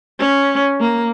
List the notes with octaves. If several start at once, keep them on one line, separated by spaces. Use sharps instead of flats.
C#4
A#3